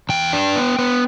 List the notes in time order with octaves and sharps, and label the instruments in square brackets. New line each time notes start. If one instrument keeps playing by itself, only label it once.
[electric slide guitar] E2 G5
D4
B3
B3